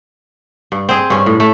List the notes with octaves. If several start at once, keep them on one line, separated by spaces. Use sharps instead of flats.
G2
C4 G#4
G2 C#4
A2
A3